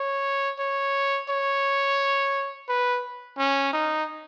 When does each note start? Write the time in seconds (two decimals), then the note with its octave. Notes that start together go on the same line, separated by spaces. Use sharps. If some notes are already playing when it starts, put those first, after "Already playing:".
Already playing: C#5
0.59 C#5
1.29 C#5
2.69 B4
3.38 C#4
3.73 D#4